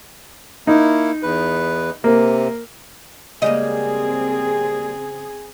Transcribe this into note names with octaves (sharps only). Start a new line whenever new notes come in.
A#3 D#4 E4
E2 B4
C3 A#3
C#3 G3 G#3 A#3 C4 G#4 D#5